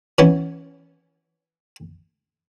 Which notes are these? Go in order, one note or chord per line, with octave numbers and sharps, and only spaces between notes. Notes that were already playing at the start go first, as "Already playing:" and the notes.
E3 B3 C#4